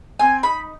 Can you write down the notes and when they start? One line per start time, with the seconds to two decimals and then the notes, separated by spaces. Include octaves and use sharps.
0.19 C4 G#5
0.43 D#4 B5